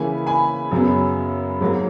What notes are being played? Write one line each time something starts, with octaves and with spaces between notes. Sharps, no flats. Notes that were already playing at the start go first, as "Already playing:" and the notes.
Already playing: C#3 E3 A#3 C#4 G#5 B5
G#5 B5
F#2 C#3 F#3 B3
G#2 F#3 A#3